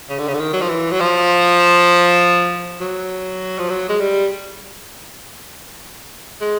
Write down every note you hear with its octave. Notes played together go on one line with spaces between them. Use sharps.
C#3
D3
C#3
D3
D#3
F#3
F3
E3
F#3
F3
F#3
F3
F#3
G#3
G3
G#3